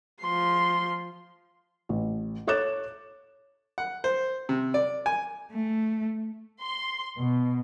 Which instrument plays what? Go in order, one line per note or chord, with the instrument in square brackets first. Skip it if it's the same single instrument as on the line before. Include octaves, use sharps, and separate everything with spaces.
[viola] F3 C6
[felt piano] A1
A4 C#5 D6 F#6 A6 E7
[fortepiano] F#5
C5
C3
D5
G#5
[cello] A3
[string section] C6
B2